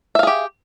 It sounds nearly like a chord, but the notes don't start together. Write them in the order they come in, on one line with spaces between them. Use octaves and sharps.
E5 F5 G#4 G4